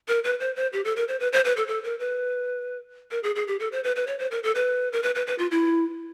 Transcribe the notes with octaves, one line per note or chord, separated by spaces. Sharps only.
A#4
B4
C5
C5
G4
A4
A#4
C5
B4
C5
B4
A4
A4
A#4
B4
A#4
G#4
G#4
G4
A4
C5
B4
B4
C#5
C5
A#4
A4
B4
A#4
B4
B4
B4
F4
E4